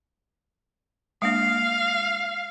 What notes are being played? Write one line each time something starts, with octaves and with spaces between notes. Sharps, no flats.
G#3 A#3 D4 F5